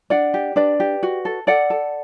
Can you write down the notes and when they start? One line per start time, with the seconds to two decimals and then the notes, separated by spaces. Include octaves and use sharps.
0.10 D4 D5 F#5
0.34 G4
0.56 D4 B4 D5
0.80 G4
1.03 F#4
1.25 A4
1.47 A4 D5 F#5
1.70 A4